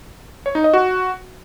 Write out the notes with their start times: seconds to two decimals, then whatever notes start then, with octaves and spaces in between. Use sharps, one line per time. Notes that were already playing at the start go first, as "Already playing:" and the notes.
0.46 C#5
0.55 D#4
0.64 D#5
0.74 F#4